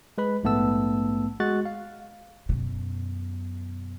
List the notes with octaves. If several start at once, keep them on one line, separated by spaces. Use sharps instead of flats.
G#3 B4 B5
A#1 G#2 A3 B3 A5 E6
G#3 F#4 F#6 A6
F5
F#2 B2